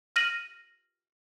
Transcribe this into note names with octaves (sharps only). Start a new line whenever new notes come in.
F6 A#6 D#7 F#7